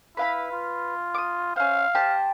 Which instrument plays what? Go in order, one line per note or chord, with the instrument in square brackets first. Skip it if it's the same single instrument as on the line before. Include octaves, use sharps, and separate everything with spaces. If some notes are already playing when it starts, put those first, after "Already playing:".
[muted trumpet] E4 [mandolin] B4 F5 B5
[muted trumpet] F4
[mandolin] D6 D#6
[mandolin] C#4 C5 [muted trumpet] F5
[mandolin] G4 C5 A5